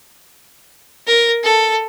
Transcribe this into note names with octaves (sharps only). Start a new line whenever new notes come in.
A#4
A4